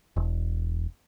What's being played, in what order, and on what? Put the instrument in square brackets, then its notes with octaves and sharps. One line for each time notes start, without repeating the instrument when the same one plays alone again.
[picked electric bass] E1